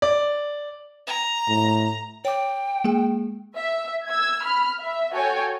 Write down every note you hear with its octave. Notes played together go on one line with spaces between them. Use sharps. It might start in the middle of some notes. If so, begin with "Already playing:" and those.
D5
A#5
A2
C#5 G5 D6
G#3 A#3 G#4
E5
E6 G#6
B5 F6
E5
F#4 A4 C#5 G5 G#5